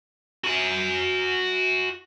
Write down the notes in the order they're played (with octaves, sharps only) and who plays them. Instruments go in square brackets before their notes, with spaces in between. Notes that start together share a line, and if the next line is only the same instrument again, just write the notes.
[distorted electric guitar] F#4 G#5